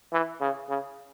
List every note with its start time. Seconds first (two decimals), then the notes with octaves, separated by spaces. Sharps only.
0.13 E3
0.41 C#3
0.69 C#3